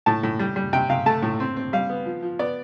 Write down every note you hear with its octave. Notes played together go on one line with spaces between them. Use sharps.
A2 A5
A2
G3
G3
C3 G5
C3 F5
A3 A5
A2
C4
C4
G3 F5
B3
F3
F3
B3 D5